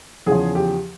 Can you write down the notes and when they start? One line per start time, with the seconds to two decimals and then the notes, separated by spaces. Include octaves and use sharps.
0.26 E2 C#3 F3 G#4
0.55 G4